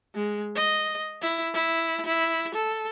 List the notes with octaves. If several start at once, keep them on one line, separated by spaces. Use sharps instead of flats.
G#3
D#5
E4
E4
E4
A4